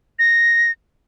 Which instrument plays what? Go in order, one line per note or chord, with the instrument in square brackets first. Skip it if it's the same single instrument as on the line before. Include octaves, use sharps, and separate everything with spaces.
[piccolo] A#6